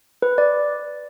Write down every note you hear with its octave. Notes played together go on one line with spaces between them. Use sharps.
B4
D5